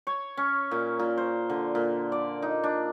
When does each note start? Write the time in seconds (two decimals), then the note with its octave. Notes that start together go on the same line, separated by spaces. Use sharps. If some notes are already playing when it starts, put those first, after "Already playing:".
0.07 C#5
0.37 C#4
0.71 A#2
0.99 A#2
1.17 C5
1.49 D3
1.75 A#2
2.12 D5
2.42 D#4
2.64 D4